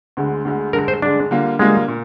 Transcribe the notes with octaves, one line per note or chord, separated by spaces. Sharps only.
D2 D3 G#3
D2 D3 G#3
G2 D3 G#3 A#4
C5
G2 D3 G#3 D4
D3 G3 A#3 F4
D3 G3 G#3 A#3 F4
A#2